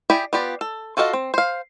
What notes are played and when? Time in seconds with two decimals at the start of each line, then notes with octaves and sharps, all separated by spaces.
0.10 E4 G4 G#4 D5 G5
0.33 B3 F4 G4 D5
0.61 A4
0.97 F4 F#4 A4 D#5 F5
1.13 C4
1.34 C5 F5